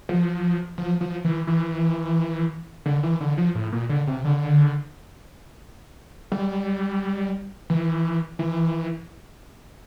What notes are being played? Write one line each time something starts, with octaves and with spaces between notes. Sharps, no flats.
F3
F3
F3
E3
E3
D3
E3
D3
F3
A2
A#2
D3
C3
D3
G3
E3
E3